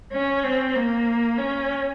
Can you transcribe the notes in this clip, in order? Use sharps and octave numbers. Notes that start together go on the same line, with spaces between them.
C#4
C4
A#3
C#4